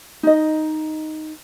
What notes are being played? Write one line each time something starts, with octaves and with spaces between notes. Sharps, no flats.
D#4 D#5